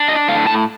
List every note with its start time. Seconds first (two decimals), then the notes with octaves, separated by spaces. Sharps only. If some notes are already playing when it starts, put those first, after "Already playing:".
Already playing: D4
0.08 D#5
0.28 A2 F5
0.47 A5